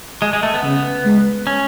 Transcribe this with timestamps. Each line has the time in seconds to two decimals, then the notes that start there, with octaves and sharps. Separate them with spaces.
0.22 G#3
0.33 G#3
0.43 A3
0.54 B3
0.64 C#3
1.05 G#3
1.47 C#4